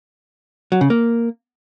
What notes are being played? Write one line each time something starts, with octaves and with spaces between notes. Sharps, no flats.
F#3
C#3
A#3